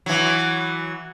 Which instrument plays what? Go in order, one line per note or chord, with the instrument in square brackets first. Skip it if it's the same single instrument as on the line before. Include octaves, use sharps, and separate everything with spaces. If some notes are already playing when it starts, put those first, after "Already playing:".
[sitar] E3 F#3